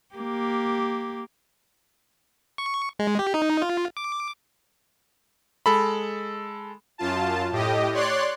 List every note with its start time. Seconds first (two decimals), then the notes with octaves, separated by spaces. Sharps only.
0.15 A#3 G4
2.58 C#6
2.99 G#3
3.19 G4
3.34 D#4
3.62 F4
3.97 D6
5.66 G#3 A4 B5
6.98 F#2 F4 A5
7.51 A2 G4 D#5
7.92 C#5 D5 C6 F#6